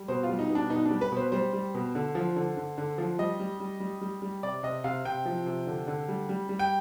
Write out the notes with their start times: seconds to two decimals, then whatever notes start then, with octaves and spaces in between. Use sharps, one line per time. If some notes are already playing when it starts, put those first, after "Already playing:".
Already playing: G3
0.08 B2 C5
0.23 F4
0.29 G3
0.39 D#4
0.50 B2
0.55 D4
0.70 B2 D#4
0.85 D4
0.90 G3
1.01 B4
1.12 B2 C5
1.32 G3 C5
1.53 G3
1.74 B2
1.95 D3
2.15 F3
2.36 D3
2.57 D3
2.78 D3
2.98 F3
3.18 G3 D#5
3.40 G3
3.60 G3
3.80 G3
4.01 G3
4.22 G3
4.43 C3 D5
4.63 C3 D#5
4.84 C3 F5
5.05 C3 G5
5.25 F3
5.46 C3
5.67 D3
5.88 D3
6.08 G3
6.29 G3
6.49 G3
6.59 G5